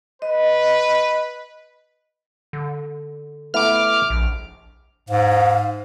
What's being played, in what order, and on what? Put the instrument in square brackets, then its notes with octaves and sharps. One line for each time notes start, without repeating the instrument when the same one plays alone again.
[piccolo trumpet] B4 [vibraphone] D#5
[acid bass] D3
[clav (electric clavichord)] A3 B3 E4 [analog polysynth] D6 F6
[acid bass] A#1
[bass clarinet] G#2 [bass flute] F5